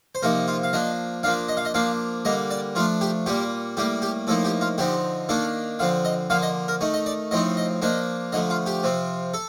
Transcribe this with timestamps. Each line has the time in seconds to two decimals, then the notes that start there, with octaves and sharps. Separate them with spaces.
0.15 C5
0.23 C3 F3 A#3 D#4 A#4
0.48 F4
0.63 F5
0.73 F3 A#3 D4 D#5
1.23 D4 F5
1.26 F3 A#3
1.49 D#5
1.57 F5
1.65 D#5
1.74 F3 A#3 D4 F5
2.25 D3 G3 A#3 D#5
2.51 D5
2.75 F3 A3 D4 F4
3.01 G4
3.26 A#2 G3 A#3 G4
3.77 A2 G3 A#3 G4
4.02 G4
4.27 A2 F3 A#3 D#4 A4
4.45 G4
4.61 F4
4.78 D3 F3 C4 D#4 G4
5.29 D#3 A#3 D4 A4
5.79 D3 F3 C4 F5
6.05 D#5
6.30 D3 F3 A#3 F5
6.42 D#5
6.68 A#4
6.81 D#3 A3 D#4
6.94 D#5
7.06 D5
7.31 A2 F3 C4 D#4 D#5
7.57 D#5
7.82 F3 A#3 D4 D#5
8.32 D3 F3 A3 D#5
8.50 F4
8.66 G4
8.83 C3 F3 C4
9.34 A4